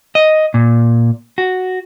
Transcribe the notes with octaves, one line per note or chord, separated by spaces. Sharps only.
D#5
A#2
F#4